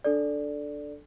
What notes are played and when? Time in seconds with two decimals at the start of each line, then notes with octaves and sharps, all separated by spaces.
0.04 D4 A4 D5